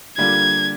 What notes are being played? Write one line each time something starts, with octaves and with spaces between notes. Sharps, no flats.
D3 G3 A#3 D4 F4 G#6